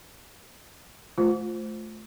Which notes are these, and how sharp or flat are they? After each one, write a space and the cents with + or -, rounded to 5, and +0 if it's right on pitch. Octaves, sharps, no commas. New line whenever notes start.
A3 -20 F4 +0 C5 +0